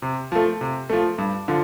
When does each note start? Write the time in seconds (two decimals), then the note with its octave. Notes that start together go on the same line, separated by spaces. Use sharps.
0.02 C3
0.32 F3 A3
0.61 C3
0.90 F3 A3
1.18 G2
1.48 D3 F3